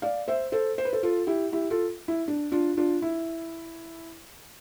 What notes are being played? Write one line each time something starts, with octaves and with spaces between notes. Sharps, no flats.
D5 F5
C5 E5
A4 C5
C5
B4
A4 C5
F4 A4
E4 G4
E4 G4
F4 A4
E4
D4
D4 F4
D4 F4
E4